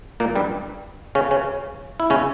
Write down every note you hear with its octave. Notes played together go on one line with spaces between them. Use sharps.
A#2 A#3
G2 G3
C#3 C#4
C#3 C#4
E4
C#3 C#4